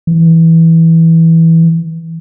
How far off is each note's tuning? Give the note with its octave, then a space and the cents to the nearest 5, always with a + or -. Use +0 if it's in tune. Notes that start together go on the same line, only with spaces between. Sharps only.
E3 -10